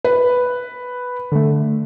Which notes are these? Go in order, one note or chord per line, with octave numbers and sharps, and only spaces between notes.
B4
D3 A3